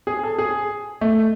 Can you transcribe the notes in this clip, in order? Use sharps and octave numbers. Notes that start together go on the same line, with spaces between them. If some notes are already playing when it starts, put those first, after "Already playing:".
G#4
A4
G#4
A3